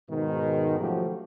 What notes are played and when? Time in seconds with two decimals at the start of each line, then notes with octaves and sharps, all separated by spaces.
0.10 G#2 B2 D#3
0.79 F3 F#3 A3 C#4 F#4 G4